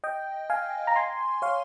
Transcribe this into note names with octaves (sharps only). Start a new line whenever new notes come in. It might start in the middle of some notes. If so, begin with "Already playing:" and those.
D#5 G5
F5 G#5
A#5
G#5 C6
C#5 F5